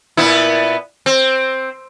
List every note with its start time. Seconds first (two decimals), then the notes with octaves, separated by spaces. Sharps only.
0.17 A#2 B3 E4
1.06 C4